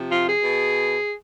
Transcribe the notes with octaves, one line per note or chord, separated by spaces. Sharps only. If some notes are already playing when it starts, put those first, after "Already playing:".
Already playing: C3 F3
F4
G#4
B2